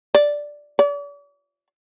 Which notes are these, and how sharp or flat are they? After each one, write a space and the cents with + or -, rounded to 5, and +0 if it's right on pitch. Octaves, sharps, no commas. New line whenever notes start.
D5 +0
D5 -45